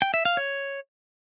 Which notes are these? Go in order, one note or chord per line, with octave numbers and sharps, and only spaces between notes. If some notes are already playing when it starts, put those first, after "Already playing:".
G5
E5
F5
C#5